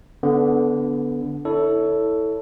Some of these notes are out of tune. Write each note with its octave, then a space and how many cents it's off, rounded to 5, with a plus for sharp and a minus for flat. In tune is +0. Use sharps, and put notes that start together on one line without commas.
D3 -20 B3 +0
E4 -20 A4 +5 C#5 +25